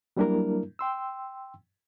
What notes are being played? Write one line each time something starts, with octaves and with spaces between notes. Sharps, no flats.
F#3 G3 A#3 D4 E4 A#4
G5 C6 E6